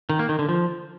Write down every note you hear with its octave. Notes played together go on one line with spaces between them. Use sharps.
D#3
A#3
D#3
D3
F3